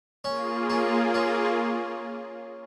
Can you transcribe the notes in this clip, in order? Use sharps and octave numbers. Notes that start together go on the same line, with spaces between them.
A#3 C#4 F4 G#4
C#4
C#4